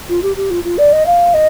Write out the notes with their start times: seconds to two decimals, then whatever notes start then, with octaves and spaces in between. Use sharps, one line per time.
0.09 F4
0.22 G4
0.36 G4
0.50 F4
0.64 F4
0.78 D5
0.92 D#5
1.06 F5
1.34 D#5